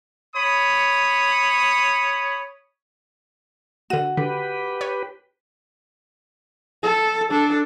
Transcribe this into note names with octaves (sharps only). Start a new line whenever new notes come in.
C#5 B5 D#6
D3 F#4 D#7
D3 G4 B4
C#5
A4
D4 A4